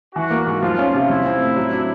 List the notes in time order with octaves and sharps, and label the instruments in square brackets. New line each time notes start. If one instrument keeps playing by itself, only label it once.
[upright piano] E3 [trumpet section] F#4
[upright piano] A#3
G#2
[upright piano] F3 [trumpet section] F4
[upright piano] C#4
C3
[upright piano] F3 [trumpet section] E4
[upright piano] C4
A2
F#3
D4